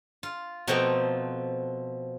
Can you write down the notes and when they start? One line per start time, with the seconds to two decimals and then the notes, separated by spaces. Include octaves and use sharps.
0.23 F4
0.68 B2 F3 A3 C4 G5 A#5